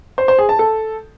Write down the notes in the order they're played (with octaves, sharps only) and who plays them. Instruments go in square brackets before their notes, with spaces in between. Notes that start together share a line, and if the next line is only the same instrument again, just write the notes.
[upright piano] C5
C5
G#4
A5
A4